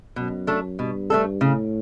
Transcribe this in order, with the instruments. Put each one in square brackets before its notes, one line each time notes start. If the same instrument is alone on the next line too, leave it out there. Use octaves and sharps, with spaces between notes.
[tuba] F#2 [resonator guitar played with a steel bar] B2
[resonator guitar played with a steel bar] A3 D4 A4
[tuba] G2 [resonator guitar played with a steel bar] B2
[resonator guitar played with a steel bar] A3 D4 A4
[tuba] A2 [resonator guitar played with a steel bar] C#3